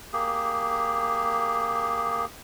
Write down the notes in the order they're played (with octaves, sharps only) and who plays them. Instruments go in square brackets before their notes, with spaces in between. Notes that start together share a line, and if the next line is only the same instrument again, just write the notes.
[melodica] A#3 G4 G#4